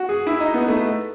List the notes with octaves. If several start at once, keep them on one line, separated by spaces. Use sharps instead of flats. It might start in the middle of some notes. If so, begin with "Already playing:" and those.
Already playing: F#4
G#4
E4
D#4
B3
A3